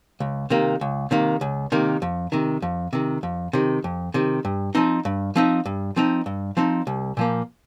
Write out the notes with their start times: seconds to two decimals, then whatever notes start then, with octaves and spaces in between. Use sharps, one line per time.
0.20 C#2
0.50 C3 D#3 A#3
0.81 C#2
1.11 C3 D#3 A#3
1.41 C#2
1.72 C3 D#3 A#3
2.02 F2
2.32 C3 D#3
2.62 F2
2.93 C3 D#3
3.23 F2
3.53 C3 D#3
3.84 F2
4.14 C3 D#3
4.45 G2
4.75 F3 C4 D#4
5.05 G2
5.36 F3 C4 D#4
5.66 G2
5.96 F3 C4 D#4
6.26 G2
6.57 F3 C4 D#4
6.87 C2
7.17 A#2 F3 A#3